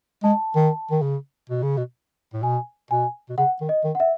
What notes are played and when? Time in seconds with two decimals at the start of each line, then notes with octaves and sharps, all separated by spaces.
0.24 G#3 A5
0.56 D#3
0.91 D#3
1.02 C#3
1.50 B2
1.63 C#3
1.77 B2
2.34 A2
2.43 B2 G#5
2.91 B2 G#5
3.29 B2
3.37 C#3 F#5
3.61 D#3
3.69 D#5
3.84 D#3
3.95 F#5
4.00 E5